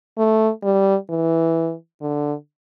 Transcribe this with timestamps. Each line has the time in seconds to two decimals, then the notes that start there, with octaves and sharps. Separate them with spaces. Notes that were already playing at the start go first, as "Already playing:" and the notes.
0.18 A3
0.63 G3
1.10 E3
2.01 D3